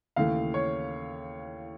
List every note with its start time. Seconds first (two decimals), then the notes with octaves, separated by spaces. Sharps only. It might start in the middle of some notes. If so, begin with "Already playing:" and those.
0.16 D#2 C#3 E3 A3 F5
0.54 C#5